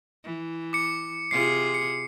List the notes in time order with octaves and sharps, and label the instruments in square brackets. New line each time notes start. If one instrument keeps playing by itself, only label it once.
[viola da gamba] E3
[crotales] D6 C#7
[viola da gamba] C3 F4 G#4 [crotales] C7
[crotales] C#7